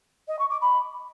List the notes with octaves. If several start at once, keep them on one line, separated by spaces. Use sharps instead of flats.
D#5
C#6
D6
B5